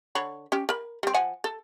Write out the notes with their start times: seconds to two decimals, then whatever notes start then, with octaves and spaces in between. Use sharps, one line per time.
0.15 D3 C#5 B5
0.52 C#4 G4
0.69 A#4 B5
1.03 G3 C4
1.14 F3 F#5 G#5
1.44 A4